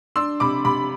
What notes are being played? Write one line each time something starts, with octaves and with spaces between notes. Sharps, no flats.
D4 C6 E6
C3 B5 D6
C3 B5 D6